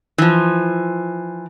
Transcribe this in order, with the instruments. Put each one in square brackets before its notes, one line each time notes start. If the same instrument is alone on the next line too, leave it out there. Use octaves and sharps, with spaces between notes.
[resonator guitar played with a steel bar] E3 F3